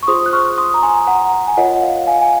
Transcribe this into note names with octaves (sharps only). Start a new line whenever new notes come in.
C#6
F4 G#4 C5 C6 D#6
F#6
C#6 F6
C6 D#6
A#5
G#5 C6
F#5 A#5
G#5
F4 A#4 C#5 D#5 F#5
F5
F5 G#5
G#5